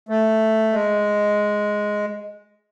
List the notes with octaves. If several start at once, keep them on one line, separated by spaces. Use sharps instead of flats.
A3
G#3